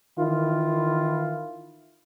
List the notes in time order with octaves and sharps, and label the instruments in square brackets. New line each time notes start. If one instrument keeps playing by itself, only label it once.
[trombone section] D#3 E3 E4 F4